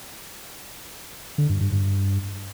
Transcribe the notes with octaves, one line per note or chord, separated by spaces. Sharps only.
D3
G2
G2
G2